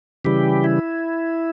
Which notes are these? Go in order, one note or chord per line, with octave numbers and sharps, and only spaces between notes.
C#3 E3 G3 G4
E4